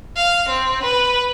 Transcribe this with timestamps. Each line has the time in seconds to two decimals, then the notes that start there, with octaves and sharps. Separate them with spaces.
0.16 F5
0.49 C4
0.83 B4